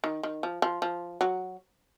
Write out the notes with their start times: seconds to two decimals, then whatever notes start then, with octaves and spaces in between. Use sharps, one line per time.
0.04 D#3
0.23 D#3
0.43 F3
0.62 F3
0.82 F3
1.21 F#3